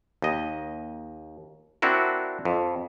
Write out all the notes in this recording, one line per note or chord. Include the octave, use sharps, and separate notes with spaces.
D#2 D#5
C4 D4 E4 F#4 A#4
F2